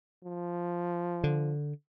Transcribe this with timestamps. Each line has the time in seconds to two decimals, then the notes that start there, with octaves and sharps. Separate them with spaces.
0.24 F3
1.24 D3